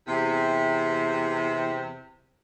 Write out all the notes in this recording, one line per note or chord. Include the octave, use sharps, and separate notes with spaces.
E2 C3